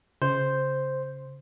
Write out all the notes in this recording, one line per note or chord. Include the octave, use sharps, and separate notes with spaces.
C#3 C5